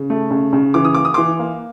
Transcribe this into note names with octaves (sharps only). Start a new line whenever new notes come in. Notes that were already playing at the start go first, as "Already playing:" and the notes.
Already playing: C#3
A3
C#3
C#3
E3 D6
D#6
A#3 D6
D#6
E3 C6 D6
A#3